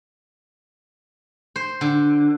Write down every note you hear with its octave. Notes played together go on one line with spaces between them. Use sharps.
C5
D3